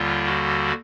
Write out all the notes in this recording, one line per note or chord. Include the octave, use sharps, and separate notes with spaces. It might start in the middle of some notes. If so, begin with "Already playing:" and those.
Already playing: D#2 D3 G3 F4
F#4